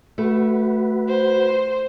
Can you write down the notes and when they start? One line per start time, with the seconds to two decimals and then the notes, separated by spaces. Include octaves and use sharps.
0.18 A3 F#4 B4
1.08 C5